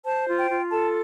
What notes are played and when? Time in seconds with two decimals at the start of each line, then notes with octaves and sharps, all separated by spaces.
0.04 C5 A5
0.26 F4
0.37 G5
0.50 F4
0.71 A4 A5